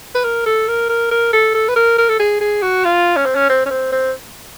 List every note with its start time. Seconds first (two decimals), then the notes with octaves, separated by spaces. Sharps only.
0.15 B4
0.24 A#4
0.46 A4
0.68 A#4
0.89 A#4
1.11 A#4
1.33 A4
1.54 A4
1.68 B4
1.76 A#4
1.98 A#4
2.09 A4
2.19 G#4
2.41 G#4
2.62 F#4
2.85 F4
3.17 C#4
3.26 C4
3.36 C#4
3.49 C4
3.66 C#4
3.71 C4
3.92 C4